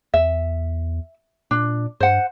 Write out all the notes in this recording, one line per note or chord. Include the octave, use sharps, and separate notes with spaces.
E2 E5
A#2 D4
G2 C5 F#5